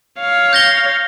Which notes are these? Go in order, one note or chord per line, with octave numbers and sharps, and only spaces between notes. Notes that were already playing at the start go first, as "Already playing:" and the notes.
C#5 F5
G6 A#6 G7